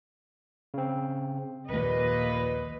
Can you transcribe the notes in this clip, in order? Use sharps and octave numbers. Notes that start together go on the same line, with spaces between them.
C#3 C4
A#1 D#2 A#2 B4 D#5